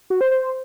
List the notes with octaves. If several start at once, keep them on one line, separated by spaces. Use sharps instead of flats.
F#4
C5
C5